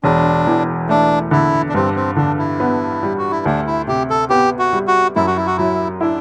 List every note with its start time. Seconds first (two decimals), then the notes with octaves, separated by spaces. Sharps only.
0.04 E1 D4
0.47 E2
0.89 A3 D4
1.31 D3 E4
1.69 D4
1.74 G2 C4
1.96 C4
2.17 D3 D4
2.39 E4
2.60 B3
3.03 G3
3.18 F#4
3.31 E4
3.45 D2 D4
3.67 E4
3.88 C3 G4
4.10 A4
4.30 B3 G4
4.59 F#4
4.73 G3
4.88 F#4
5.16 F#2 E4
5.27 F#4
5.36 E4
5.47 F#4
5.57 F#3 E4
6.01 D4 E4